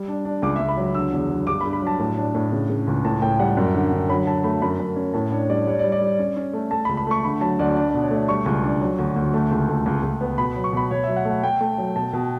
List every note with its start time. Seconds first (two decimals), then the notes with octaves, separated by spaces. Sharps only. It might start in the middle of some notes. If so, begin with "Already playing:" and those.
Already playing: G3
0.08 D4
0.25 D4
0.42 C#2 D6
0.56 C#2 E5
0.69 B5
0.77 F#3
0.94 D3 E6
1.12 E2
1.30 F#3
1.47 G2 D6
1.61 B5
1.65 G2
1.73 B5
1.82 F#3 A5
1.99 A2
2.17 D4
2.35 A2
2.52 C#3
2.70 C#3
2.87 C#2
3.05 A2 A5
3.22 A2 G5
3.39 G3 F#5
3.57 F#2
3.74 D3
3.92 D3
4.09 F#3 B5
4.27 F#3 A5
4.44 A3 B5
4.62 F#2 B5
4.80 F#2
4.96 C#4
5.14 A2 A5
5.32 D4 C#5
5.49 G3 D5
5.67 G3 C#5
5.79 D5
5.84 G3
5.92 D5
6.01 G3
6.19 C#4
6.36 C#4
6.53 A3
6.71 A3 A5
6.85 B5
6.89 C#2
6.97 B5
7.07 A3 C#6
7.24 D3 B5
7.41 F#3 A5
7.59 D2 D5
7.76 D4
7.89 D5
7.94 B2
8.02 C#5
8.11 A3 D5
8.28 G3 C#6
8.46 C#2
8.64 D4
8.81 F#3
8.98 D2
9.16 D2
9.34 A3
9.51 C#2
9.69 A3
9.86 C#2
10.03 C#2
10.21 B3
10.38 B2 B5
10.56 F#3
10.64 C#6
10.73 B2 B5
10.91 B2 C#5
11.04 F#3 E5
11.16 F#5
11.25 A3
11.30 F#5
11.43 A3 G5
11.61 A3
11.78 F#3
11.96 B2 A5
12.13 B2